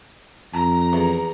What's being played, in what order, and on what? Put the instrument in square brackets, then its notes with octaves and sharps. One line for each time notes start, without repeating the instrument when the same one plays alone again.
[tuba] F2 [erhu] A#5
[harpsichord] E2